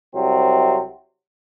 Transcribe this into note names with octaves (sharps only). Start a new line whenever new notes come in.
C2 C3 F#3 C4